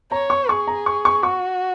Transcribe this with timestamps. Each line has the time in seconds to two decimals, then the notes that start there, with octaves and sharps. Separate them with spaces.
0.12 C#5 A#5
0.30 C#6
0.49 G#4 C#6
0.68 A#5
0.86 C#6
1.05 C#6
1.23 F#4 C#6